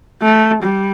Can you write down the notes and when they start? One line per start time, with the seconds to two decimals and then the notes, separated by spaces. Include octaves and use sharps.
0.22 A3
0.63 G3